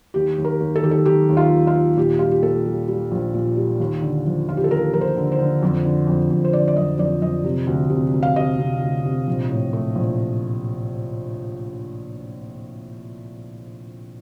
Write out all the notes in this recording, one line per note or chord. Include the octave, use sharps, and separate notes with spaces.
D#2 G4
D#2
A#4
D#2
A4
D#3 G4
A4
D#3 G4
D#2
F4
D#2
F4
D#2
A#2 G4
G3 F4
G4
A#2 A4
G3
G3
A#1
A#2
G3
D#2
D3
F3
D#2 F4
G4
A4
D#2 A#4
F3 A#4
C5
D3
C5
D3
F2
D3
F2
F2
C5
D3 D5
D5
F2 D#5
F2 D5
F2 D#5
C3
D2
C3
D2
F5
C3 D#5
C3
D2
C3
A#1
A2
A3
A#1